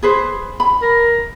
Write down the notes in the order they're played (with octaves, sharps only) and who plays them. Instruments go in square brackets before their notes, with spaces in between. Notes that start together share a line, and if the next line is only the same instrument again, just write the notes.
[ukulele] G#4 B4 C5
B5
[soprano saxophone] A#4